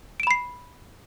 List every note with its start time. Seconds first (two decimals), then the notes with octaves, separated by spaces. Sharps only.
0.20 D7
0.23 E7
0.27 B5
0.31 C7